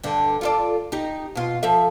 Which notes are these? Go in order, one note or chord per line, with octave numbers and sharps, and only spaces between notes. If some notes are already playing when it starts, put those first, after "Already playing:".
G2 D3
F4 A4 D5
D#4 G4
B2 F4
F3 A4 E5